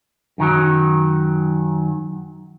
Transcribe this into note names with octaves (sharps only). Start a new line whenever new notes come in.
F#2 D#3 F#3